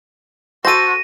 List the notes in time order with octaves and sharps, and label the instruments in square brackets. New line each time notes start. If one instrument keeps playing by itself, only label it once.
[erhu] F#4 [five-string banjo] A4 C5 [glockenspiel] A#6 D#7